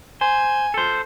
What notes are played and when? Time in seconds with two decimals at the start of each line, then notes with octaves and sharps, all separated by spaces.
0.21 C5 G#5
0.74 A4 C5